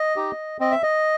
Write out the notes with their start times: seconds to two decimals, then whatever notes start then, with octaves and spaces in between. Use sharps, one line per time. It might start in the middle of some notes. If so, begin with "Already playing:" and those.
Already playing: D#5
0.16 D#4 G4
0.60 C4 D#5
0.71 E5
0.83 D#5